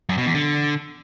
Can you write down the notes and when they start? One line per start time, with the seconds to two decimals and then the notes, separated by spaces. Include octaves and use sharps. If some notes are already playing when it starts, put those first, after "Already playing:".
0.09 F#2
0.18 B2
0.26 E2
0.35 D3